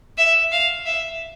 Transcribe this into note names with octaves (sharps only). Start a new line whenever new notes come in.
E5
F5
E5